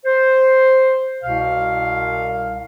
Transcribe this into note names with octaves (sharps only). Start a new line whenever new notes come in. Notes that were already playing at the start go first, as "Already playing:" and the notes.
C5
C2 B2 F5